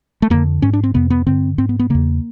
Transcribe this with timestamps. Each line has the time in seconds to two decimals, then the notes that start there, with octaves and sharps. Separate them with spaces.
0.22 A3
0.30 F2 D3 A#3
0.62 G#2 C#4
0.73 D4
0.83 C4
0.94 F2 C3 B3
1.10 B3
1.26 G2 D3 C4
1.58 G#2 C4
1.69 B3
1.79 B3
1.90 E2 C#3 A#3